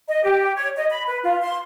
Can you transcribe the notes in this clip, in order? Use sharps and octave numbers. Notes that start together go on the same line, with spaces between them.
D#5
G4
C#5
D#5
B5
B4
F4
C6